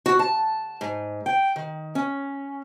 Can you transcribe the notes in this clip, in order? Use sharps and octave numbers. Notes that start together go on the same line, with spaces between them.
F#4
A5
G#2
G5
D#3
C#4